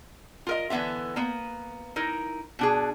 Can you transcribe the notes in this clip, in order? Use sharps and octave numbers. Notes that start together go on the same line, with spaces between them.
F4 A#4 D#5
D3 E3 B3 F4 E5
A#3 B3
D#4 E4 A#4
B2 D4 G#4